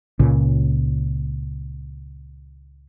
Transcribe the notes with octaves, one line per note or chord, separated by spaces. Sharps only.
C#2 A#2 C#3